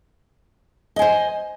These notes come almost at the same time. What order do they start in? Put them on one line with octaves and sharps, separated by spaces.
D#5 G#5 C5